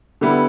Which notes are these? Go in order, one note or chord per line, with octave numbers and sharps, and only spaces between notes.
D3 G3 B3 E4